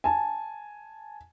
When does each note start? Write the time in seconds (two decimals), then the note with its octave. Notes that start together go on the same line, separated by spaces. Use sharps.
0.04 G#5 A5